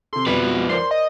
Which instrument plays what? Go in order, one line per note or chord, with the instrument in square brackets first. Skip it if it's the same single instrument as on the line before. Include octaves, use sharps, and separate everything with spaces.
[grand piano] C3 A4 [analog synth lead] C6
[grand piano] F2 G3 B6 [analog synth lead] B2 [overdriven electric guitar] F3 B4
[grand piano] A#4 C5 D5 [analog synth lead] C6
[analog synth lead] D#5